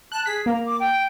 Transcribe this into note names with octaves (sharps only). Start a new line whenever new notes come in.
A5 F#6
G#4 B6
A#3 A#5
D6
G5